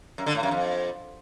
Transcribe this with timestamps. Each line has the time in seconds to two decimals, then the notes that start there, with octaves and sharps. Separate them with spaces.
0.18 F#2
0.26 D3
0.35 A2
0.43 F#2
0.51 F2